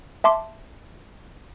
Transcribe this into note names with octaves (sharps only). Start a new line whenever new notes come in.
E5 A5 C6 D6